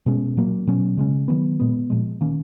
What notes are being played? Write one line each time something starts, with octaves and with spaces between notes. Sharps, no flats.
B2 G#3 C#4
A#2 F#3 A#3
B2 F#3 C#4
C#3 G#3 C#4
D#3 F#3 B3
A#2 G#3 B3
A#2 F3 G#3
D#3 A#3 C#4